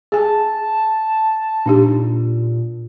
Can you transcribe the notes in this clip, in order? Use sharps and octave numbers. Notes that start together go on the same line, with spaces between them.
G#4 G#5 A5
A#2 D4 D#4 G4